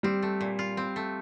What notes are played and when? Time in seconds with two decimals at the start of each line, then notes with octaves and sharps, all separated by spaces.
0.03 G3 C4
0.22 A3
0.41 A#2
0.59 F4
0.77 C4
0.96 A3